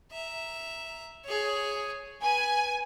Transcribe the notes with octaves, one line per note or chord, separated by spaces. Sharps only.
E5 A#5
G#4 C#5
B4 G#5